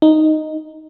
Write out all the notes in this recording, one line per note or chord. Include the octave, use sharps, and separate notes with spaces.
D#4